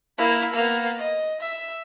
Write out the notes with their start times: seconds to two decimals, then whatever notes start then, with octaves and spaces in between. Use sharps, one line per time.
0.18 A#3 E4
0.53 A#3 B3
0.98 D#5
1.40 E5